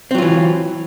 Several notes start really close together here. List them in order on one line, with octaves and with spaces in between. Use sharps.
C4 F#3 F4 E3